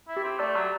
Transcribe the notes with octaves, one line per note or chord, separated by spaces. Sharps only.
E4
G4
C4
A3 D5
F#3